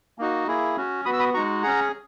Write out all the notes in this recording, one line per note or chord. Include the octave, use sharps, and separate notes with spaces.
A#3 D#4 F#4
A#3 E4 G#4
C#4 F#4
B3 F#4 B5 D#6
E6
B5 D#6
G#3 D#4 F#4 A#5 C#6
C#4 G#4 F#5 A#5